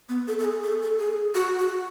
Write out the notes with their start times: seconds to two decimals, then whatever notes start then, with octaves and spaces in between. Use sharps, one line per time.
0.09 B3
0.28 A4
0.39 A4
0.45 G#4
0.64 A4
0.82 A4
0.99 G#4
1.35 F#4
1.59 F#4